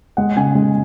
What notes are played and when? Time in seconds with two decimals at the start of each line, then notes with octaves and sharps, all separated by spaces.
0.17 G#3 F#5
0.36 C#3 G#5
0.55 G#3